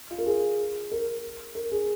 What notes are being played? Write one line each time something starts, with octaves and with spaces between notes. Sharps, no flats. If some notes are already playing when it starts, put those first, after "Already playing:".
F4
A#4
G#4
A#4
A#4
G#4